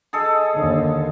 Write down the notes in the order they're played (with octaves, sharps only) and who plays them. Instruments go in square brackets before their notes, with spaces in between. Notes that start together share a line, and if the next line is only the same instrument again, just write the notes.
[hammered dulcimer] G#4 A4 D#5
[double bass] D#2 D3